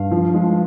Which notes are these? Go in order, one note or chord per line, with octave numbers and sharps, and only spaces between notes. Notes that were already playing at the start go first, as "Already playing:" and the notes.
Already playing: G2 F5
F3
G#3